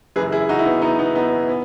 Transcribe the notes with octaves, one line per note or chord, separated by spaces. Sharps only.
F#1 F#2 E3 G#4 B4
E4 G#4
D#4 F#4
E4
B3 D#4
B3 D#4
B3 D#4
B3 D#4
B3